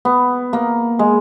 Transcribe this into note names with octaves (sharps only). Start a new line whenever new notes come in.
B3
A#3
G#3